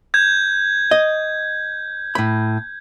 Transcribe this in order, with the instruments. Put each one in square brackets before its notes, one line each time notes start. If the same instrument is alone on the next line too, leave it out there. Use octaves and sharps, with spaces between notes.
[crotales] G6 G#6
[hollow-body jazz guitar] D#5
A2 B5